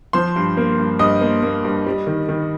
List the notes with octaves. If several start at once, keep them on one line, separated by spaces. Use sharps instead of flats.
F3 C5 C6
G2
A#3
G2
G2 D#5 D#6
A#3
A#3
G2
G3
D#3
D#3